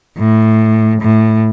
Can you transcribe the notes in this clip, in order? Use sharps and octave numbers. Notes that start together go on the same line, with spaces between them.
A2
A2